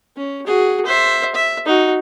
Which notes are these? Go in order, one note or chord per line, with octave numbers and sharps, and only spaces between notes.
C#4
F#4 G#4
C5 E5
E5
D#4 F#4